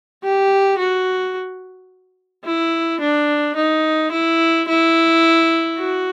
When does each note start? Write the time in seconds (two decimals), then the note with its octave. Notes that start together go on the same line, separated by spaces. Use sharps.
0.24 G4
0.79 F#4
2.45 E4
3.00 D4
3.56 D#4
4.12 E4
4.68 E4
5.79 F#4